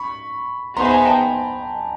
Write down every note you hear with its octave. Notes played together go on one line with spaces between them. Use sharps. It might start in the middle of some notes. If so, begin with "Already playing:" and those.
Already playing: B5 C#6
B3 D#4 G#4 C5 E5 A#5 C6
B5
G#5 A#5
G5 A5